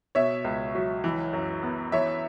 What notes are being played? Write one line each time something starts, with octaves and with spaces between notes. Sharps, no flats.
B2 C#5 E5
C#2
F#3
E3
F#2
B3
E3 C#5 E5